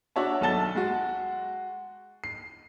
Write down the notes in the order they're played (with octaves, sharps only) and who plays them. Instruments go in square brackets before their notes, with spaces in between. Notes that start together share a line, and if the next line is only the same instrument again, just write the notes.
[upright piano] D4 F#4 C#5 E5 A5
B1 A4 F#5 A5 A6 G7
G#3 F#4
C7